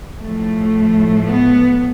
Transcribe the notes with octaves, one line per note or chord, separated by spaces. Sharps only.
A2 F3 A3
B3